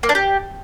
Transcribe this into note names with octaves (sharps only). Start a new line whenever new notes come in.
A#3
D4
G4